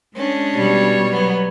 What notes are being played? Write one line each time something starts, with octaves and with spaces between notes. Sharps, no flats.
G#3 C#4 D4
B2 G3 C#5
F#3 B3